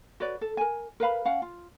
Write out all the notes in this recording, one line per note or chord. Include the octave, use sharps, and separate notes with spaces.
F#4 B4 C#5 D5
A4
A#4 G#5
A#4 B4 F5 B5
C#4 F5 F#5
F4